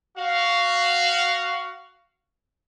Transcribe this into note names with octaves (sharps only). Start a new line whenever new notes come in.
F#4 F5